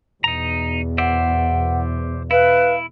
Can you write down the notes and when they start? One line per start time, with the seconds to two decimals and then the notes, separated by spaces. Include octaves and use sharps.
0.24 E2 B2 D#4 A#5
0.98 C5 D5 E5 F#5
2.31 E4 B4 F5